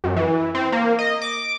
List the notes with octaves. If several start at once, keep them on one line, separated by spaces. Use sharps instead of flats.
F#2
E3
C4
A#3
D#5
D6